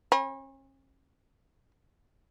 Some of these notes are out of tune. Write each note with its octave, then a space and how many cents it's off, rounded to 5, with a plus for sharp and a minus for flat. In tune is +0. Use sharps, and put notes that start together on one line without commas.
C#4 -40 B5 -20